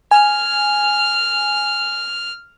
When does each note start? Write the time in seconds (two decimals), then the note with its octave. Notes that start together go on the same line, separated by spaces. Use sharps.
0.11 G#5 F6